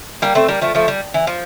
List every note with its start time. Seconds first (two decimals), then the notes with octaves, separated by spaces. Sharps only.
0.22 G3 A#3
0.35 A3 C4
0.48 G3 A#3
0.61 F3 A3
0.75 F3 A3
0.88 G3
1.14 E3
1.27 F3